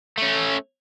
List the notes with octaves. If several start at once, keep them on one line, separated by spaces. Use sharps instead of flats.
A3 C#4